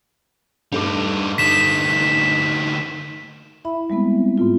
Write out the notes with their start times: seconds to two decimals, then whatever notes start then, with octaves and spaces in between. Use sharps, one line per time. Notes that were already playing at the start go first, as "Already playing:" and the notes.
0.72 G2 G3 A3 D#4 D6
1.38 D2 D#4 B6 E7
3.65 E4 E5 B5
3.90 G3 G#3 B3 C4
4.38 G#2 B3 F4